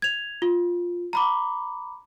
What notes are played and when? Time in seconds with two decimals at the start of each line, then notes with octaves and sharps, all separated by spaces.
0.02 G#6 F7
0.42 F4
1.13 A#5 B5 D6